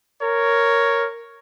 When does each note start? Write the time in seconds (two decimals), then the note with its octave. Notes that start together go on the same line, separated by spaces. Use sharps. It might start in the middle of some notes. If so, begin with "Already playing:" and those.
0.22 A#4 C#5